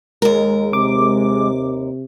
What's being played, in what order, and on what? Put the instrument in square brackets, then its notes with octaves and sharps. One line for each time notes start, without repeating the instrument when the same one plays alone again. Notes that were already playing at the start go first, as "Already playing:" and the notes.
[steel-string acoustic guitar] D#2 A#4 [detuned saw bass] G#3
[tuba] C3 [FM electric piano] D6